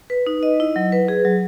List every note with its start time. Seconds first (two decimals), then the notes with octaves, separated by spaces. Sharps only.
0.10 B4
0.27 D#4
0.43 D#5
0.60 E4
0.76 F#3
0.92 B4
1.08 G#4
1.25 F#3